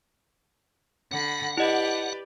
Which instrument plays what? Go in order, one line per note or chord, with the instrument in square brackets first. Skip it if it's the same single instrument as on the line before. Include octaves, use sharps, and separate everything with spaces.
[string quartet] D3 B5 [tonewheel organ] F#5
[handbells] E4 D#5 [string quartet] G4 B4 D5